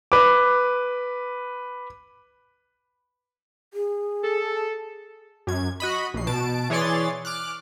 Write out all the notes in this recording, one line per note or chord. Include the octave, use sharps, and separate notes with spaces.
B4 D6
G#4
A4
F#2 G#6
F#4 D#5 B5
A#1 C7
B2 A5 D7
E3 G#4 C#5 D5 C6 A6
D6 F6 F#6